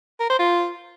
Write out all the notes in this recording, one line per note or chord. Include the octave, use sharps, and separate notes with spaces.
A#4
C5
F4